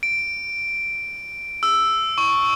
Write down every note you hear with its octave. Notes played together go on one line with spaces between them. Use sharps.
D7
E6
C#6